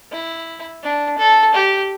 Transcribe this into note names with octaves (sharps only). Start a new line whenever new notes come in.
E4
D4
A4
G4